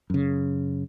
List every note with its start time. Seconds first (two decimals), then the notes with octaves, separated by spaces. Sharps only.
0.10 F#2 C#3